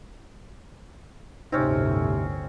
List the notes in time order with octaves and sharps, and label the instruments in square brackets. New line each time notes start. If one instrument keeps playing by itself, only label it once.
[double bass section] G1 D2 A2 [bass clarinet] C3 [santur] C4 C#4 [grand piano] D#4